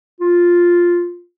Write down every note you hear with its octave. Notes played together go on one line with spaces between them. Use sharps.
F4